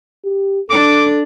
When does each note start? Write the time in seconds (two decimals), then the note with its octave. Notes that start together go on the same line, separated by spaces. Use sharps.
0.25 G4
0.70 D4 A4 D6